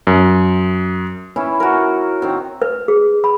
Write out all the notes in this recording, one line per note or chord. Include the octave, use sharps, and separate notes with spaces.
F#2
E3 C#4 E4
F#4 A#4
D#3 C4
B4
G#4
B5